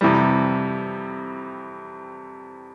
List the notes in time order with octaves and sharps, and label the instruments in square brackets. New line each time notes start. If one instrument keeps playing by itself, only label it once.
[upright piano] F2 C3 E3 G3